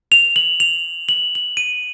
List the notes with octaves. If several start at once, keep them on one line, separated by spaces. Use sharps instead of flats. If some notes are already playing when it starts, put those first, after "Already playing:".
F7
F#7
F7
F#7
F#7
D#7